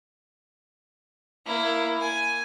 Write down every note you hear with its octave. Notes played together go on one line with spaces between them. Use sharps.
A#3 E4
G#5